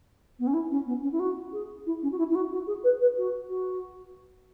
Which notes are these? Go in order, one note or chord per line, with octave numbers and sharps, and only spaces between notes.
B3
C#4
E4
C#4
B3
C#4
E4
F#4
G#4
E4
C#4
F#4
E4
E4
F#4
F#4
G#4
B4
B4
F#4
F#4